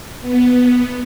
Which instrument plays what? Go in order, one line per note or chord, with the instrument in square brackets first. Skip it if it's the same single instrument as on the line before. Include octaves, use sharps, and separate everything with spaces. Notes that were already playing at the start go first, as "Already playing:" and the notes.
[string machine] B3